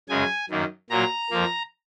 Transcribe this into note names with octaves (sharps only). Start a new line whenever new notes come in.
F#2 C#3 G#3 G#5
F#2 D#3 A#3
A#2 F#3 A#3 A#5
F2 F3 A#3